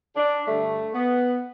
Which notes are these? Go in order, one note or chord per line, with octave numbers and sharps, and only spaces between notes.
D4
G2 D3 G3 A3
B3